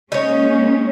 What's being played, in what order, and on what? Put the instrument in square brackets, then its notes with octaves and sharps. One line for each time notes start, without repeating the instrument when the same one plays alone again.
[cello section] G#3 A#3 C#4 [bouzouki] D#4 C#5